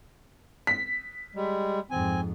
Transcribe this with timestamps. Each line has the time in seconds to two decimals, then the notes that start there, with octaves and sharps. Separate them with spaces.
0.67 B6
1.36 G3 G#3
1.91 F2 G#2 C4 G#5